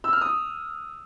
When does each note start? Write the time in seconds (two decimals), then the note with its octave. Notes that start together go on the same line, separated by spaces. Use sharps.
0.04 E6
0.13 F6
0.21 D#6